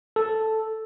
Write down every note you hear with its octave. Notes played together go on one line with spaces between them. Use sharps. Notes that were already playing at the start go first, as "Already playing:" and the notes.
A4